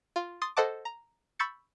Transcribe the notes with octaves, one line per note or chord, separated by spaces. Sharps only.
F4
C6 D#6 A6 C7
A4 C5 D#5 F#5 A5 D6
A#5
B5 C#6 E6 G6 A6 C#7